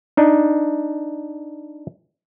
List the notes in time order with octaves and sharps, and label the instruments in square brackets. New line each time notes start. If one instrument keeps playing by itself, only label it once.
[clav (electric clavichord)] D4 D#4